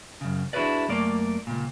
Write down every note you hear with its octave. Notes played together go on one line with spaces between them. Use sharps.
F#2 C#3
D4 E4 F#4 G#4 B4 D5
F#2 A3 A#3 D5
C#2 A#2